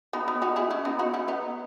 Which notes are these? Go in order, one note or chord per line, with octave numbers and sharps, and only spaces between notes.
B3 D#4
B3 D#4
D#4 F#4
E4 G#4
C#4 E4
B3 D#4
D#4 F#4
C#4 E4
B3 D#4